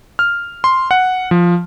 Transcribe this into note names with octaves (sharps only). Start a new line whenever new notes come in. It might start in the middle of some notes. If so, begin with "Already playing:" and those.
F6
C6
F#5
F3